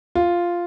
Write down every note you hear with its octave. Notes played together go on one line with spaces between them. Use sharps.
F4